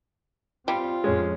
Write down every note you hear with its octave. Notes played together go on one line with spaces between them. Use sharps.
G3 C4 F4
F2 A2 G#3 C#4